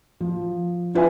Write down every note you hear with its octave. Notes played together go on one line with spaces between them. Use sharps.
F3
D4 F4 B4 E5 G#5